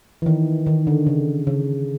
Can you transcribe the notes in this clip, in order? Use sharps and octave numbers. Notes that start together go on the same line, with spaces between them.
E3
D#3
D#3
D3
C#3
C#3